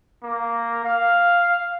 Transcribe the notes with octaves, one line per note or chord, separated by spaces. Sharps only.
A#3
F5